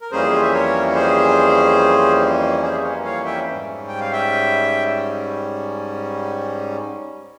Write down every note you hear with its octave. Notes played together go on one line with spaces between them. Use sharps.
A#4
F2 E3 G3 A#3 C#4 G#4 C5
E5
A#4 C#5
G#4 C5
G#4 C5
E5
A#4 C#5
C#5 F5
E5 G5
G#2 G3 C#4
G5
F5
E5 G5